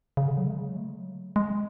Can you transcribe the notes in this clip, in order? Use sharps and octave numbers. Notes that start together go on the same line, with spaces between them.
C#3
D3
F#3
G#3
F#3
A3
G#3
F#3
G#3